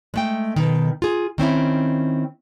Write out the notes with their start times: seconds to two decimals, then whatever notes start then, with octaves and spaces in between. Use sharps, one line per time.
0.14 G#3 A3 G5
0.56 B2 D#3
1.02 F4 G#4
1.38 D#3 C4 C#4 E4